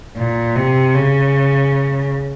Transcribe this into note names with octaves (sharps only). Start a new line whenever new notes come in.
A#2
C3
C#3